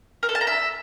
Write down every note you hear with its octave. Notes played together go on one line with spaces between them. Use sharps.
A#4
A4
A5
A#5
E5